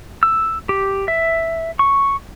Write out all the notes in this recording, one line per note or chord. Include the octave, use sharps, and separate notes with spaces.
E6
G4
E5
C#6